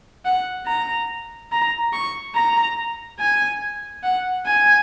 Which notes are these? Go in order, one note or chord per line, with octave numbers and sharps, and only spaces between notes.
F#5
A#5
A#5
C#6
A#5
G#5
F#5
G#5